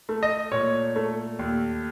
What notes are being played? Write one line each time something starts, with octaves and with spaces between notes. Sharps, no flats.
A3
D#5
A#2 C#5
A3
D#2